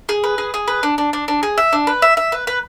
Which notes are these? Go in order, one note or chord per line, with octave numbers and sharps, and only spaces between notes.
G#4
B4
G#4
G#4
B4
D4
D4
D4
D4
G#4
E5
D4
B4
E5
E5
B4
B4